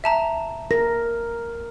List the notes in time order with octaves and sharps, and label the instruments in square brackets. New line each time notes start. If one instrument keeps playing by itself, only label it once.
[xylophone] E5 A5 A#5
[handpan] A#4 [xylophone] A#6